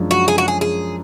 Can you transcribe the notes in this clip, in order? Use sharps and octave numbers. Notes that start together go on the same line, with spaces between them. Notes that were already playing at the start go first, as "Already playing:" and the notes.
Already playing: F#2 F3 G#3 D4
F#4
G#4
F#4
G#4
G#4